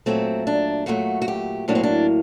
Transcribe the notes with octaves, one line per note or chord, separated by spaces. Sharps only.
A#2 F#3 A3 C4
D4
A#2 F#3 A3 F#4
F#4
G4
A2 F#3 A#3 D4
C4
D4